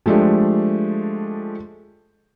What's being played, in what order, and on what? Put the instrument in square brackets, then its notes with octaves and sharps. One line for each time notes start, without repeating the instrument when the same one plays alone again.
[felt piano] F3 G#3 A3 D4 G4